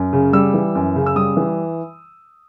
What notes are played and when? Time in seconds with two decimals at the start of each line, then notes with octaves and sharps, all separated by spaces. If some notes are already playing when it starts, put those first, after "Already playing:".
Already playing: F#2
0.13 C#3
0.33 G3 E6
0.54 E3
0.75 F#2
0.96 C#3
1.06 E6
1.16 G3 D#6
1.37 E3